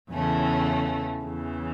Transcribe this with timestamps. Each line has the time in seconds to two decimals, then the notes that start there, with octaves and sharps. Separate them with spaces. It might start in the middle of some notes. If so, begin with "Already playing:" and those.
0.10 E2 C#3 E3 A3 C#4
1.24 E2 C#3 E3